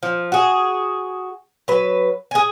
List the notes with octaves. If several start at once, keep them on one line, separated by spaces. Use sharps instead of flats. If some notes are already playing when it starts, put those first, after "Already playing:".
F3
F#4 G#4
F#3 B4
G#4 G#5